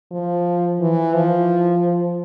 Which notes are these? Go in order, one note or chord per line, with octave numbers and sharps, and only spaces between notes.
F3
E3
F3